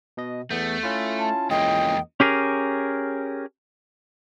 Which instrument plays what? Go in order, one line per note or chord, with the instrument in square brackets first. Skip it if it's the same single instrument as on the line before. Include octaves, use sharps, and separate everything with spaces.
[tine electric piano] B2 D#5
[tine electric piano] E2 B3 G6 [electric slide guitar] A3
[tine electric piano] C#4 E4 F4
[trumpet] A5
[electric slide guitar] E2 G#3 A#3 [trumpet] D#5 [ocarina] G5
[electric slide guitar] C#4 G4 G#4 A#4